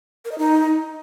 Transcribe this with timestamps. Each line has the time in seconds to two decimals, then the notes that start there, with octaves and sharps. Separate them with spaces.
0.25 A#4
0.31 D#5
0.38 D#4